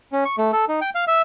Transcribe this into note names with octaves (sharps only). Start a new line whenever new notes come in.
C#4
C#6
A3
A4
D#4
G5
F5
E5